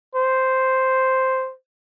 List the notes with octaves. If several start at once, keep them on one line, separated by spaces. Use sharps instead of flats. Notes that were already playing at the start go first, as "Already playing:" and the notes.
C5